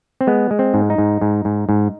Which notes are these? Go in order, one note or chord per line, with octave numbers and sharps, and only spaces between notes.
C4
G#3 B3
G#3
C4
G#2
D#4
G#2
G#2
G#2
G#2